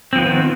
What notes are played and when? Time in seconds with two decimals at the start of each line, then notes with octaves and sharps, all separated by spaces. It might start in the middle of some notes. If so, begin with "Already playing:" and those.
0.13 C4
0.15 F3
0.18 B3
0.21 D#3